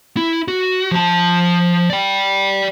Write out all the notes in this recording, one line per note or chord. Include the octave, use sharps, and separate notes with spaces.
E4
F#4
F3 A5
D5 G5